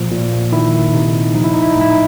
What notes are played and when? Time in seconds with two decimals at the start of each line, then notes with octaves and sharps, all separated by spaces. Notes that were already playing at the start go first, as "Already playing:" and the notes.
Already playing: A#2 F3
0.11 A#2
0.52 D#3 E4
0.93 C3 D#4
1.35 F3 D#4
1.44 E4
1.54 D#4
1.62 E4
1.72 A2 D#4
1.81 E4
1.90 D#4